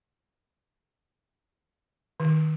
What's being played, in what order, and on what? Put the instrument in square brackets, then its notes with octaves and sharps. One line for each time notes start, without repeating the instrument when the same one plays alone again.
[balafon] D#3